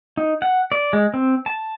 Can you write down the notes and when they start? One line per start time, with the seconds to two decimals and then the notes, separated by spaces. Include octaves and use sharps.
0.17 D#4
0.42 F#5
0.72 D5
0.93 G#3
1.14 C4
1.46 A5